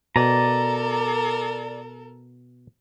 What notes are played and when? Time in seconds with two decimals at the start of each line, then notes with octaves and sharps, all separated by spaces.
0.16 B2 A4 A#4 D5 G#5 A#5